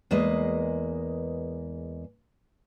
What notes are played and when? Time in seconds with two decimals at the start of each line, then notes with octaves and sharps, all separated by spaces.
0.11 E2 G#3 A#3 B4 D#5